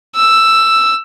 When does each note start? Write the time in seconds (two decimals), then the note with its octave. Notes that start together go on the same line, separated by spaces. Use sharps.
0.15 E6